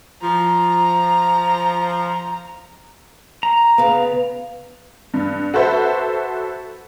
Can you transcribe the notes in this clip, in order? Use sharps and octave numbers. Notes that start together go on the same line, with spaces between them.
F3 A#5
A#5
C#3 B3 F5
G2
F#4 A4 B4 C5 E5